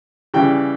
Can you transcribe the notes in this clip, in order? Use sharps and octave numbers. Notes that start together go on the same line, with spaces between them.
C#3 E3 G3 G5